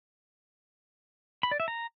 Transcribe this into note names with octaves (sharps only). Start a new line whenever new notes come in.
B5
D5
E5
A#5